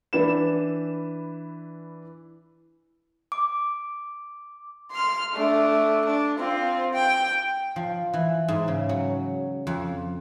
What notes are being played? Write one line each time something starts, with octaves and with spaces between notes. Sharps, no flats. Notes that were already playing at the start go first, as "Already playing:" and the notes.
E3 D4 B4 E7
D6
C6 F6
A3 D4
D4
C4 F4
G5
F3
E3
G#2
C#3
F#3
F2